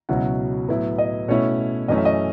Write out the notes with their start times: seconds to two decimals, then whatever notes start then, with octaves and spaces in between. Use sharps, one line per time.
0.09 C#2 B2 F#3 C#4 E4 F#5
0.68 A2 F#3 B3 E4
0.98 D#5
1.28 B2 A3 C#4 E4 C#5
1.88 F#2 E3 A3 C#4 D#5
1.98 E5
2.05 D#5